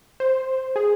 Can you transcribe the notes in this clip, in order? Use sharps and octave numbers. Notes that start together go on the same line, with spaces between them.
C5
G#4